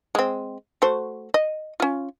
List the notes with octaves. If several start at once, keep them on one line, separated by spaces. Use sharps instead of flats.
G#3 C4
A3 F#4 C5
D#5
C#4 F4